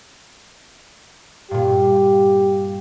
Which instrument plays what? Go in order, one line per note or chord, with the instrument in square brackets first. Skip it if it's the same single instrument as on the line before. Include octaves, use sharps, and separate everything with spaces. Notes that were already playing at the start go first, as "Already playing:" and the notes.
[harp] G2 A#2 [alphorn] G4